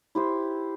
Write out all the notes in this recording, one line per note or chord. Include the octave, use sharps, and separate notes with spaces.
E4 G4 C5